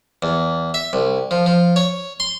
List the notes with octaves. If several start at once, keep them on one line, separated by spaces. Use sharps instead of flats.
E2
E5
C2
F3
F3
C#5
C6